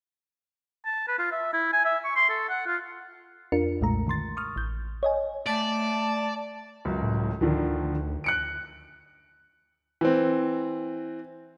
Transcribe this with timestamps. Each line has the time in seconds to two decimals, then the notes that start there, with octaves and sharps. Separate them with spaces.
0.85 A5
1.08 B4
1.19 F4
1.32 E5
1.53 E4
1.73 G#5
1.85 E5
2.05 C#6
2.16 C6
2.29 A4
2.49 F#5
2.67 F4
3.52 F2 D4 F4 A#4 C#7
3.81 B1 F2 A#2 G#3 A3 A#5
4.07 D3 D#3 C6 A6
4.37 C#6 D#6 F6
4.56 A1 G6
5.03 C#5 D#5 G#5
5.47 A3 D5 A5
6.85 C#2 F#2
7.02 A2
7.41 D2 D3 D#3 F3
8.24 F#6 C#7 D7
10.01 E3 C4